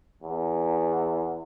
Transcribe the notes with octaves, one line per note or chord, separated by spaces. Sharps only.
E2